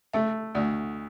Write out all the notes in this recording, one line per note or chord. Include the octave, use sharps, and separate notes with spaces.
A3 E5
D2 D5